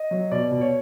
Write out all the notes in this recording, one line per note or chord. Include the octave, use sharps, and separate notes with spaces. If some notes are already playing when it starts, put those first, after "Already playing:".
Already playing: D#5
F#3
B2 D5
B2
C#5